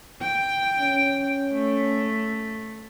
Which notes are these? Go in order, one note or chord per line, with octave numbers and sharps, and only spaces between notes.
G5
C#4
A3